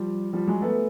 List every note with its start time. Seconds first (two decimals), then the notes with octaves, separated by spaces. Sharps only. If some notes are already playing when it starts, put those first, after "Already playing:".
Already playing: F3 G3
0.33 F3 G3
0.47 F#3 G#3
0.62 A3 B3